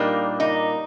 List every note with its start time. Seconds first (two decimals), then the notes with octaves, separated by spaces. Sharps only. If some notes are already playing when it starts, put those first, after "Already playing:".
Already playing: A#2 G3 A#3 D4 D#4
0.40 D#4